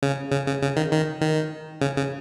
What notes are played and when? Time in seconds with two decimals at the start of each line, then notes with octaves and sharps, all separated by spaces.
0.03 C#3
0.32 C#3
0.47 C#3
0.62 C#3
0.77 D#3
0.92 D#3
1.21 D#3
1.81 C#3
1.96 C#3